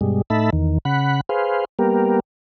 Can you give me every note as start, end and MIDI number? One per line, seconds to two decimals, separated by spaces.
0.01 0.22 43
0.01 0.22 47
0.01 0.22 55
0.01 0.22 56
0.30 0.50 45
0.30 0.50 57
0.30 0.50 63
0.30 0.50 76
0.30 0.50 81
0.30 0.50 83
0.53 0.78 40
0.53 0.78 51
0.85 1.21 49
0.85 1.21 78
0.85 1.21 83
1.29 1.65 68
1.29 1.65 71
1.29 1.65 72
1.29 1.65 77
1.79 2.20 55
1.79 2.20 58
1.79 2.20 59
1.79 2.20 67
1.79 2.20 70